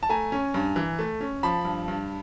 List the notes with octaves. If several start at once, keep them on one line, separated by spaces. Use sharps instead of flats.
A5
A3 G#5 A#5
C#4
G2
E3
A3
C#4
F3 A5 B5
G2
G2